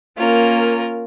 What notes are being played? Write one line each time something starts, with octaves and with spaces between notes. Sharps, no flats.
A#3 C#4 F4 A#4